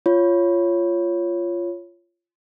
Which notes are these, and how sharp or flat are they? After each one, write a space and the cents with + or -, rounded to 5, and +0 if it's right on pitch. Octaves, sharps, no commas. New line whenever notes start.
F4 -15 C#5 +0